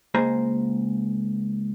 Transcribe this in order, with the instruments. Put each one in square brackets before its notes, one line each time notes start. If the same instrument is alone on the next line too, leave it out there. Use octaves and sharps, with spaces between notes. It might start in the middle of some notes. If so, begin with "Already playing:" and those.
[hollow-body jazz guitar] C#2 A#3 G#4 C5 D#5 A#5